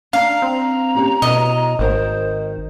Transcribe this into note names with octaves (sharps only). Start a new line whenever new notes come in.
D4 F5 A#5
C4
C#4 G4 C#5
B2 E4 C#5 D#5
G#1 D#3 A#4 C5